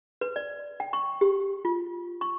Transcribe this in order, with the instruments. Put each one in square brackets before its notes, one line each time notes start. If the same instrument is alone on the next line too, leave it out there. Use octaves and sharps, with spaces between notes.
[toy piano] B4
D5
G5
C#6
G4
F4
C#6